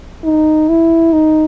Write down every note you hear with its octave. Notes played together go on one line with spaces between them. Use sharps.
D#4
E4
D#4